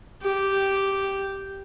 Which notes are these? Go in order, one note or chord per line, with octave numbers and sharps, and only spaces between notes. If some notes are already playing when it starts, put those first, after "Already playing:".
G4